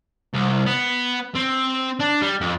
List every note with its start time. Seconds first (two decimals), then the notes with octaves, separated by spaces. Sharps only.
0.34 C2
0.66 B3
1.35 C4
1.99 D4
2.22 G3
2.41 F2